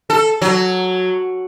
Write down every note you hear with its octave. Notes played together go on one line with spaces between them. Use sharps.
A4
F#3